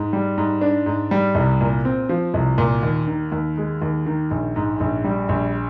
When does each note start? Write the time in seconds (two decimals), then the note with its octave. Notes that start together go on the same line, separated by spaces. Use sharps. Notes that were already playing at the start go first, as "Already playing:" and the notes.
Already playing: G#2
0.13 G3
0.38 G#2
0.61 D4
0.86 G#2
1.11 G3
1.35 C2
1.61 A#2
1.85 C4
2.09 F3
2.34 C2
2.58 A#2
2.83 D#2
3.07 D#3
3.32 D#2
3.57 G#3
3.82 D#2
4.06 D#3
4.31 A#1
4.56 G#2
4.80 A#1
5.04 G3
5.29 A#1